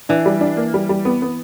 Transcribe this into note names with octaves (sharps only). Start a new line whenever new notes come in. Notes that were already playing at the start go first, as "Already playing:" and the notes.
E3 D4
G3
D4
A#3
G3
G3
B3
B3